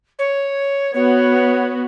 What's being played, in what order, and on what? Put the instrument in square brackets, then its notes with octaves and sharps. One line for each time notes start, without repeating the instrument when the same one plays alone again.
[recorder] C#5
[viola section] B3 F#4 [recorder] C#5